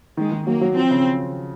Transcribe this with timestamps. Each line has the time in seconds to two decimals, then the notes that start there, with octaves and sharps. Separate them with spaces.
0.17 D#3 G#3
0.32 D#3
0.46 F#3 A#3
0.61 F#3
0.76 F3 C4
0.91 C#3